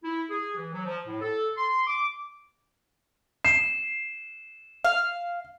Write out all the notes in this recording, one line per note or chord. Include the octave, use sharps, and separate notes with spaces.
E4
G#4
E3
F#3
F3
A2
A4
C6
D6
C7 E7
F5